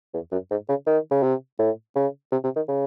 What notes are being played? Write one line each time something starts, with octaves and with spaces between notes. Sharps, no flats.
E2
F#2
G#2
C#3
D#3
C#3
C3
A2
C#3
C3
C3
D#3
C#3